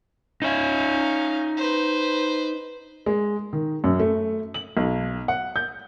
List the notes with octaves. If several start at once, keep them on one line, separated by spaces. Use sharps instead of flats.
C#4 D#4 E5 F5
B4 C5
G#3
D#3
F#2
A3
F#7
B1
F#5
G6